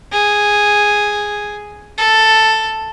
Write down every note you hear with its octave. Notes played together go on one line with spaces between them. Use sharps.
G#4
A4